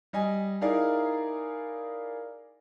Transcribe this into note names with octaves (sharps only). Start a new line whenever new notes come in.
G3 D#5 G#5
D#4 E4 G#4 A#4 D5 F5